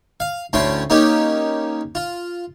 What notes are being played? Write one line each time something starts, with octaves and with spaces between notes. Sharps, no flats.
F5
D2 A2 C#4 G5 C6
A#3 C#4 D#4 G4
F4